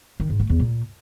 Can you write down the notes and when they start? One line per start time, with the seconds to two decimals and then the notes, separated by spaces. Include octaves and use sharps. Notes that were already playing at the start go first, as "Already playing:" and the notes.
0.20 D#3
0.30 G#2
0.40 A3
0.50 E2
0.60 A#2